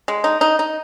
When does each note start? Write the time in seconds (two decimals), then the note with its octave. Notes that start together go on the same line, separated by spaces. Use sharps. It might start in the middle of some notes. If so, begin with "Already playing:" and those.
0.08 G#3
0.24 D#4
0.41 D#4
0.59 D#4